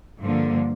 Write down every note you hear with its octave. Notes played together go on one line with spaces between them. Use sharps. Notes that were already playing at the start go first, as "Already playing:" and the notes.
G2 D3 F3 A#3